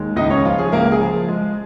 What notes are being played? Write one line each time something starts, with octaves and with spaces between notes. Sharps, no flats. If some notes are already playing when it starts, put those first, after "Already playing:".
Already playing: D#2 G#3
C#2 D#4 D#5
C#4 C#5
F3 F4
G#4
C#2 A#3 A#4
G#4
F3
G#3